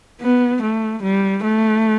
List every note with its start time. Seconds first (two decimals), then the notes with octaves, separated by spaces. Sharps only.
0.21 B3
0.62 A3
1.03 G3
1.43 A3